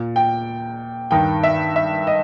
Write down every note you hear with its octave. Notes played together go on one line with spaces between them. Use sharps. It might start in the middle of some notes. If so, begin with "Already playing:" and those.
Already playing: A#2
G5
G2 D#3 G5
E5
E5
D#5